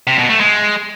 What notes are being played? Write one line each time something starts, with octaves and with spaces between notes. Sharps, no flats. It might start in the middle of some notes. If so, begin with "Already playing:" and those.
C3
B2
A3
G#3